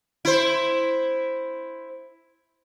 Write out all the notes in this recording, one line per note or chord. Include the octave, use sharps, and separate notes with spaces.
E4 C5